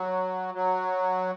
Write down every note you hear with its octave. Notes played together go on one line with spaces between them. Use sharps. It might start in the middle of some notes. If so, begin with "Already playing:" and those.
Already playing: F#3
F#3